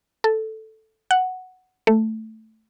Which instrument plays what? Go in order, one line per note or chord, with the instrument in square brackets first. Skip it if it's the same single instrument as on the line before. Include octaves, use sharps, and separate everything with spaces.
[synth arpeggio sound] A4
F#5
A3